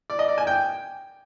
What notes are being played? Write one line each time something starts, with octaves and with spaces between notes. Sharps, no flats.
D5
D#5
D5
G#5
G5